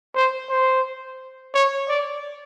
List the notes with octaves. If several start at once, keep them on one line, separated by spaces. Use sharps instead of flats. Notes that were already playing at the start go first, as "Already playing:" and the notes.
C5
C5
C#5
D5